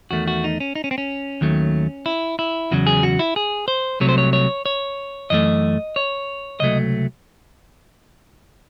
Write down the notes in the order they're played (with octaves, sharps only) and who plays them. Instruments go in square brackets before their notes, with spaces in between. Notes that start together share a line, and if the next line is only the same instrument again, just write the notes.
[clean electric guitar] E2 D#3 A3 F#4
F#4
D#4
C#4
D#4
C#4
C4
C#4
D#2 D#3 F#3 A3
E4
E4
E2 C#3 F#3 F#4
G#4
F#4
E4
G#4
C5
C2 C3 F#3 A3 C#5
C5
C#5
C#5
C#5
F#2 E3 A3 D#5
C#5
C#2 C3 F#3 A3 D#5